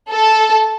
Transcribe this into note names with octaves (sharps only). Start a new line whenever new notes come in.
A4